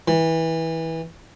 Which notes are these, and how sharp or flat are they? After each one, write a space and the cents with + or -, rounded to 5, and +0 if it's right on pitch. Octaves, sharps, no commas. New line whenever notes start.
E3 -20